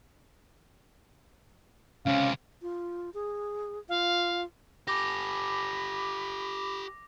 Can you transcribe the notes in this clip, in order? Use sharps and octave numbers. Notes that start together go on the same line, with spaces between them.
C#2 C3 C#4 F5
F4
G#4
F4 F5
G4 A4 B5 D6 A#6